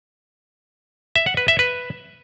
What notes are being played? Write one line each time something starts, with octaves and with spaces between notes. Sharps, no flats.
E5
F#5
B4
E5
B4